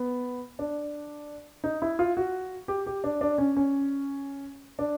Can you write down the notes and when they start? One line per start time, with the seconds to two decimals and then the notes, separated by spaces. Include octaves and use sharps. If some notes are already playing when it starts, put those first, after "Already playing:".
Already playing: B3
0.59 D4
1.64 D#4
1.82 E4
1.99 F4
2.17 F#4
2.68 G4
2.86 G4
3.04 D4
3.21 D4
3.38 C#4
3.57 C#4
4.79 D4